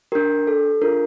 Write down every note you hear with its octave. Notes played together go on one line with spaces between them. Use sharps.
D4 G4 A#4
A4
D4 F4 G#4 A#4